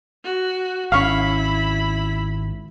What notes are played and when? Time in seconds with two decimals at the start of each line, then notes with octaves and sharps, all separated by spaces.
0.24 F#4
0.92 G#1 C#4 E4 F5 B5 C#6